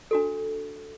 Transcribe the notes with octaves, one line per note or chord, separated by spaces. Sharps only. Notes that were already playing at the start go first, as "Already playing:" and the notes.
D4 F#4 A4